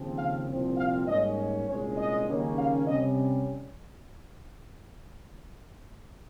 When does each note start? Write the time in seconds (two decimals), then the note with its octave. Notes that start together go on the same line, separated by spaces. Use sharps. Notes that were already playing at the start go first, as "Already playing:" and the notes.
Already playing: D#2 C#3 F3 C4
0.17 F5
0.47 C2 A#2 F3 C4
0.76 F5
1.07 G#2 G3 A#3 C#4 D#5
1.67 C2 A#2 G#3 C#4 C#5
1.97 D#5
2.27 D#2 C#3 G3 A#3 C#4
2.57 F5
2.87 C3 G3 C#4 D#5